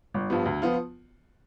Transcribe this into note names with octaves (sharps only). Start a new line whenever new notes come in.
G1
G2 F3 B3
D2
F3 B3 F4